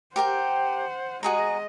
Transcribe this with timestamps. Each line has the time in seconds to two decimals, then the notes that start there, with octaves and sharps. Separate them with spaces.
0.16 G4 A#4 C5 F#5 G5
1.23 G#3 F#4 G#4 D#5 A#5